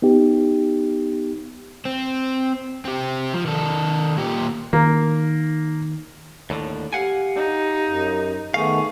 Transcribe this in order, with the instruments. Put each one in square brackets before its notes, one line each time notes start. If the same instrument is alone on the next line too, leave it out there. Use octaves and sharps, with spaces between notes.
[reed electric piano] B3 D#4 G4
[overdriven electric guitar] C4
C4 G4
F3
D#3 A4
A#2 G4
[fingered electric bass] D#3 [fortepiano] A#3
[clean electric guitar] D#2 A2 D3
[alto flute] G4 [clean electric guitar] F5 F#5 G#5
[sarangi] D#4
[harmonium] F#2
[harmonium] D#3 A3 B3 [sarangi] G#4 [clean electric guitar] F5 [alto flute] C#6